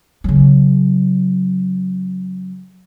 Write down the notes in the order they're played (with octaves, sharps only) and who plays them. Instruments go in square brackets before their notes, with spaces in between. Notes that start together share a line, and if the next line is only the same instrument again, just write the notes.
[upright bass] C#3 F#3